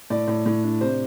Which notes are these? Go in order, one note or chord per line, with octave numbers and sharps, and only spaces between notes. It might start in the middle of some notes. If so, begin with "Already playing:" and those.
A2 D5
A2
A2
D4
C3 C5